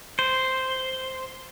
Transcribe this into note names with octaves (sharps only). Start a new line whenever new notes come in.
C5